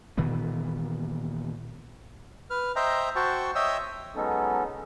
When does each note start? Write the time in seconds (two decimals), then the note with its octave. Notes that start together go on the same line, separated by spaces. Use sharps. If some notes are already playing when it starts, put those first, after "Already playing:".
0.17 A#2 D#3 E3 B3
2.50 B4 F6
2.76 C5 D#5 E5 G5 A#5
3.16 F#4 C5 G5 A5 C#6
3.55 C#5 D#5 E5 G5 D#6 E6
4.16 F#3 G#3 B3 C#4 D#4 A4